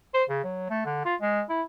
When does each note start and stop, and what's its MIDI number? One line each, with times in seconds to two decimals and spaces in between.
0.14 0.23 72
0.29 0.40 49
0.44 0.65 54
0.70 0.81 57
0.85 1.00 50
1.05 1.15 65
1.21 1.43 56
1.49 1.62 64